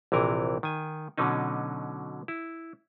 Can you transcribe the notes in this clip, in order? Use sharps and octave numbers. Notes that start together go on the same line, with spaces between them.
A#1 C3 E3 A#4
D#3 G#5
B2 D3 F#3 C#4 D#4
E4